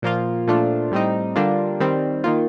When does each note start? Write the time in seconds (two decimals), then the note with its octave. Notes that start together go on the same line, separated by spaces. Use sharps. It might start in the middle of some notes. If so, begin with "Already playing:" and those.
0.02 A#2 F3 A#3 F4
0.47 A#2 F3 A3 D4 F4
0.91 A2 G3 C4 D#4
1.36 D3 G3 A#3 D4 F4
1.80 D#3 G3 C4
2.24 D#3 A#3 F4